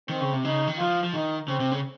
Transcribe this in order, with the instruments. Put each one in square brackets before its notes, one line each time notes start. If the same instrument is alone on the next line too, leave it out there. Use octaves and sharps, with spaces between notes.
[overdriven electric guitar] D#3 [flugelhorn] C4
[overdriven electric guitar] C#3
C3
[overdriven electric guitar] C#3 [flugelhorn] D#4
[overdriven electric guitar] D#3
[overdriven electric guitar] F3 [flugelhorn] F4
[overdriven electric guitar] F3
[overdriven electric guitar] D#3 [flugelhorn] D#4
[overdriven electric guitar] C#3 [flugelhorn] C4
[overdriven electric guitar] C3
C#3